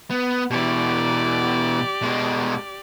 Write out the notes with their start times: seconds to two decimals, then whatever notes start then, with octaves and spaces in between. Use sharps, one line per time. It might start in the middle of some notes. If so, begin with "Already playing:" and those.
0.10 B3
0.51 B2 E3 G4 D5
2.02 B2 G#3